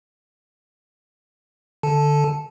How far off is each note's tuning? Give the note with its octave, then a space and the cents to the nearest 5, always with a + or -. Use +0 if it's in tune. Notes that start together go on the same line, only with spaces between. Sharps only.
D3 +0 A4 +0 A5 -10